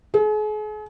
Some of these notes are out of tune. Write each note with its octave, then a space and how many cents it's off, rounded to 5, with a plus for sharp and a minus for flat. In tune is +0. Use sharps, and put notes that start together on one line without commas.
G#4 +40